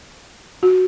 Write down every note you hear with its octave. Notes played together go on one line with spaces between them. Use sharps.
F#4